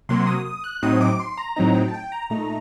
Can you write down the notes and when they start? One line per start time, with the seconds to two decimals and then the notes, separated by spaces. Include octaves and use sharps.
0.09 C3 F#3 A#3 C6
0.27 D#6
0.45 D#6
0.64 F#6
0.82 A2 F#3 C4 D#4 D#6
1.01 D6
1.20 C6
1.38 A#5
1.56 A2 F#3 C4 D#4 A#5
1.75 G5
1.88 A5
1.94 G5
2.12 A#5
2.30 A#2 A3 D#4 A#5